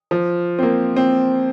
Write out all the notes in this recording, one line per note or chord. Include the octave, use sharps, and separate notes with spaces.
F3
C4
A#3
C4